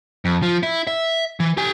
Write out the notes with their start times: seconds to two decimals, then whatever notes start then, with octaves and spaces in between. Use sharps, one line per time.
0.25 F2
0.42 F3
0.63 E4
0.87 E5
1.40 E3
1.57 G4 G#5